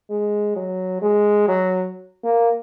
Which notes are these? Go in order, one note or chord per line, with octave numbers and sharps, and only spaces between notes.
G#3
F#3
G#3
F#3
A#3